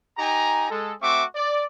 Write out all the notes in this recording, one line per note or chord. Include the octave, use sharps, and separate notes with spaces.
D#4 G4 G#5 A#5
G#3 A4
A3 C4 F#4 E5 C#6 D6
D5